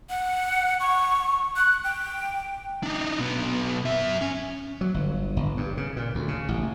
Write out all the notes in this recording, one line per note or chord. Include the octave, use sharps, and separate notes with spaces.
F#5
C#6
F#6
G5
D4 D#4
B1 B3
F#2 E5
C#4
F#3
G1
G1
G2
C#3
A#2
D2
C#3
A1